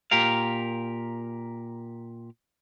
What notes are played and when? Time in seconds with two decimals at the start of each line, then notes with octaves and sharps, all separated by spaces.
0.11 A#2 G4 A#4 F5